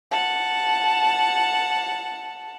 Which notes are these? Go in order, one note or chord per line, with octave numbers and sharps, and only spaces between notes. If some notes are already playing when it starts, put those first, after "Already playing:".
F#5 A5